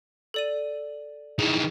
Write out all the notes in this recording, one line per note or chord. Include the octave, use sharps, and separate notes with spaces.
A4 D5 D#7
D#3 E3 G#4